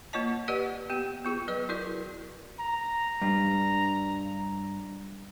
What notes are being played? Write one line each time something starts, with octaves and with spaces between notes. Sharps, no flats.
A#3 F4 C#5 D#5 A5
G4 B4 D5 D#5 F#5
B3 G4
B3 F4 G#4
F#3 B4 D5 D#5
E4 F#4 A#4 D5
A#5
G2